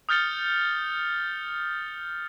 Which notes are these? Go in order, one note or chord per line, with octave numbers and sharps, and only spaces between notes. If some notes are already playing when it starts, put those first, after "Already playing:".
D#6 F6 G6 A6 C#7 G7